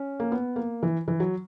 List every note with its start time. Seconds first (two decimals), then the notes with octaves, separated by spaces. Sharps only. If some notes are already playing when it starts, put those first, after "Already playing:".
Already playing: C#4
0.20 A#3
0.32 B3
0.56 A#3
0.83 E3
1.08 E3
1.20 F#3